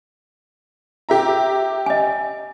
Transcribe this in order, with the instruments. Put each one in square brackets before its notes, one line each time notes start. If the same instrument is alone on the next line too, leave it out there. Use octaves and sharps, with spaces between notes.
[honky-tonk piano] G4 E5 A#5
[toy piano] D#5 G#5